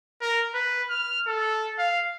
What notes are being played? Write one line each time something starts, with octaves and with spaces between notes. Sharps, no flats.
A#4
B4
F6
A4
F5